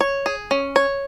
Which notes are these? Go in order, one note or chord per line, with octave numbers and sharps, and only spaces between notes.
C#5
G#4
C#4
C#5